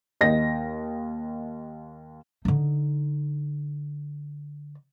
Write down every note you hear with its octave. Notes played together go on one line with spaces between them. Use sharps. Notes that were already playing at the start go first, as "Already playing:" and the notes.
D#2 D#5 A#6
D3 D#4